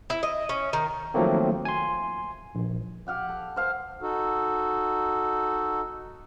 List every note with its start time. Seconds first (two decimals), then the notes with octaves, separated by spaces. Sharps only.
0.10 E4
0.23 D#5
0.49 C#4
0.73 D#3
1.14 D#3 F3 F#3 A3 A#3 C4
1.65 G#5 C6
2.55 A#1
3.07 G4 F5 F#5 G#5
3.29 A4
3.56 C5 F5 A5
4.02 D#4 F#4 A4